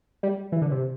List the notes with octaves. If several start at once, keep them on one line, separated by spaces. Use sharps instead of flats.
G3
E3
D3
C3